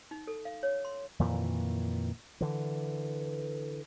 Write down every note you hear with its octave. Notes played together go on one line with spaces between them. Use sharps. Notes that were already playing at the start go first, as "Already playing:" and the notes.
D#4
A4
F5
C#5
C6
F2 A#2 D#3 E3
D3 E3